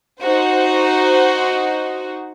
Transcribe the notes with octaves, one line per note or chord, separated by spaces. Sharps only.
D#4 F#4 C5